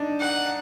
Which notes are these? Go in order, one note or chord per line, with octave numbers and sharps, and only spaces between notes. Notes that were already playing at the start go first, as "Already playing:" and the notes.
Already playing: D4 D#4
F#5